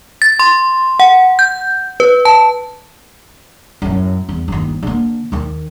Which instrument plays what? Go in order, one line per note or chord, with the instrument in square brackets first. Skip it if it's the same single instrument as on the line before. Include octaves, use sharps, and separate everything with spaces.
[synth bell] A6
C6
F#5
G6
B4
A5
[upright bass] F#2 A2
E2
G1 D#2
D3 A#3
D#2 D#3